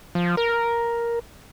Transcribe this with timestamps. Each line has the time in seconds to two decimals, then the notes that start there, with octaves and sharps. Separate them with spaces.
0.15 F3
0.37 A#4